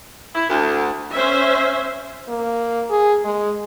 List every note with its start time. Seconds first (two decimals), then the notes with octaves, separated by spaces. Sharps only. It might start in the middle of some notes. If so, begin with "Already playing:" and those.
0.35 E4
0.49 D2
1.12 C#4 C5 E5
2.28 A#3
2.90 G#4
3.24 G#3